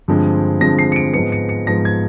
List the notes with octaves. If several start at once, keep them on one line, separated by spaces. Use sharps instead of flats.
G2 D3 F3 G#3 C4
G2 D3 F3 G#3 C4 A#6
C7
C#7
D7
G#2 F3 G#3 B3 C#7
C#7
C#7
G#2 F3 G#3 B3 A#6
G#6